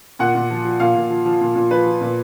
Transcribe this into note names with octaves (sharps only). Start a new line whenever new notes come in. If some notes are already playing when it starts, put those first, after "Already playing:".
A#2 F#5
A#2
F3
F3
A#2 F5
A#2
F3
F3
A#2
A#2
F3 B4
F3
A#2